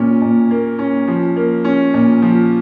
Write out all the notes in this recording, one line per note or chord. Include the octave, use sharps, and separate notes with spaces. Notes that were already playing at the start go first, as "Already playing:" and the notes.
Already playing: A#2 C#4
A#2
A#3
C#4
F3
A#3
C#4
A#2
F3